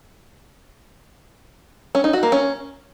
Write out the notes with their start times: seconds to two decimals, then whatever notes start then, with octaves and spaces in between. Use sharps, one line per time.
1.95 C#4
2.04 D#4
2.13 F#4
2.23 A#3
2.32 C#4